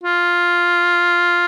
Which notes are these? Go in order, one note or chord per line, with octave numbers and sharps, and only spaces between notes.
F4